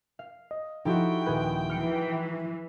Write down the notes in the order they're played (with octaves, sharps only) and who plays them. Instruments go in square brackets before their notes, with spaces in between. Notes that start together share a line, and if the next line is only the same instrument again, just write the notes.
[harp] F5
[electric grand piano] D#5
[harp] F3 G4 A4 [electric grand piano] D#4 E4 F#4 [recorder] G5
[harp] D#1 G#4 B4
[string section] E3 [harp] F6 C#7 D7